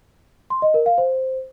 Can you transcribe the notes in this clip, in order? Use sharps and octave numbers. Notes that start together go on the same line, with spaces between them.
C6
D#5
A#4
F5
C5